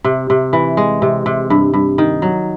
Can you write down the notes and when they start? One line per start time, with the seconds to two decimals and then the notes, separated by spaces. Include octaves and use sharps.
0.04 C3
0.30 C3
0.53 E3
0.77 G#3
1.02 C3
1.26 C3
1.50 G2
1.74 G2
1.98 D#3
2.22 F#3